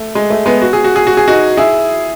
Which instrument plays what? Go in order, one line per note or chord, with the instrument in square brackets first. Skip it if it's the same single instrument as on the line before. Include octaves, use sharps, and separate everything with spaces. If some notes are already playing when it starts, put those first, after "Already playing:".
Already playing: [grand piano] A3
G#3
A3
G#3 B3
F#4
G#4
F#4
G#4
F#4
G#4
D#4 F#4
E4 G#4